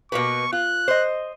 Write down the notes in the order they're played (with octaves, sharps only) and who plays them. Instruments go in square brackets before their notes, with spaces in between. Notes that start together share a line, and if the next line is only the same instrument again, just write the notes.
[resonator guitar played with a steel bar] B2 A#3 B4 [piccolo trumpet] C#6
[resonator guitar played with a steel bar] F4 [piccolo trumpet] F#6
[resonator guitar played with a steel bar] C5 D#5